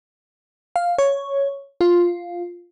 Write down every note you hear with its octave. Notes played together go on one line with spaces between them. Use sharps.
F5
C#5
F4